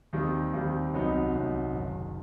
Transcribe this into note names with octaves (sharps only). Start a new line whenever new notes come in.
D#2 D#3 G3 C4
D#2 D#3 G3 C4
C2 C3 F#3 B3 D#4
C2 C3 F#3 B3 D#4
F#1 F#2 D#3